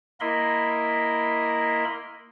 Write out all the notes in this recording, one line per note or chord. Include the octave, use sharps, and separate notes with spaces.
A#3 E4 A#4 D#5 B5 C6